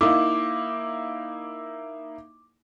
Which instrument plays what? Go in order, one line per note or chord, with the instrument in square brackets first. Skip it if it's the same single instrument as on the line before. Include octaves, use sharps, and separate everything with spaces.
[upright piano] A#3 D#4 E4 [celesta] D6